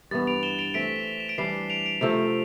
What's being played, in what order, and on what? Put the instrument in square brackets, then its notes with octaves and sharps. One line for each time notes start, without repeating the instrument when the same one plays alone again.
[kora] G2 E3 B3 [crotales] A6
[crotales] D7 F7
E7 G7
D7 F7
[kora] E3 A3 C4 [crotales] B6 D7
[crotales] E7
D7
[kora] E3 G3 D4 [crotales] C7
[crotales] C7
D7 F7
D7 F7
[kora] C3 F3 A3 C4